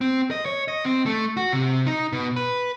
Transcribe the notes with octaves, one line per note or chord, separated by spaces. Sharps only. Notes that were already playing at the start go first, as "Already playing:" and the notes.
C4
D#5
C#5
D#5
C4
A3
F#4
C3
D#4
B2
B4